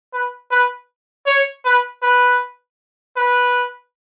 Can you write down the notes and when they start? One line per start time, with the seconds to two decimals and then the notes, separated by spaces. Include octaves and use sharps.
0.13 B4
0.51 B4
1.26 C#5
1.65 B4
2.02 B4
3.16 B4